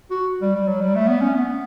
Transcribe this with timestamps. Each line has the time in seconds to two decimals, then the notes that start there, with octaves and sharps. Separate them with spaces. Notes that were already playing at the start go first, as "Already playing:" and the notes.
0.11 F#4
0.42 G3
0.55 G3
0.68 F#3
0.81 G3
0.95 A3
1.08 B3
1.22 C#4
1.35 B3